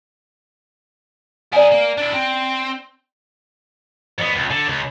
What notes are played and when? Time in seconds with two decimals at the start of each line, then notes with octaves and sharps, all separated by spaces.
1.53 G#4 A#4 D5 G#5
1.71 A#3
1.97 D4 E4
2.13 C4
4.18 F2 B3
4.34 C#2
4.51 D3
4.67 C#2